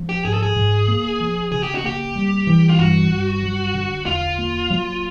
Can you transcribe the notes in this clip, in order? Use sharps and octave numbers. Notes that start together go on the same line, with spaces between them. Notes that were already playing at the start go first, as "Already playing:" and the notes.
Already playing: F3
G4
G#2 G#4
A4
G#4
G#2
A#3
F3
C#3 G#4
G4
F#4
A#3 G4
G3
E3
F4
G2 F#4
G2
F#3
D3
E2 F4
A#3
F#3